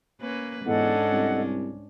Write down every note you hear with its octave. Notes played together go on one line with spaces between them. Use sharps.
A#3 C#4 B4
E2 G#2 C#4 D4 A4 D#5 F#5
C2